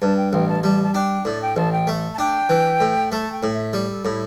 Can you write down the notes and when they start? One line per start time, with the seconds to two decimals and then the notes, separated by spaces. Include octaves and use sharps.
0.02 G2 A5
0.17 G5
0.33 A1 G5
0.48 A5
0.63 G3 A5
0.83 A5
0.94 D4 G5
1.25 A2 D5
1.42 G5
1.57 A1 A5
1.72 G5
1.87 A3
2.14 A5
2.19 D4 G5
2.49 E3
2.81 A2
3.11 A3 A5
3.32 G5
3.43 A2
3.53 E5
3.73 G3 D5
3.90 A4
4.05 A2 E4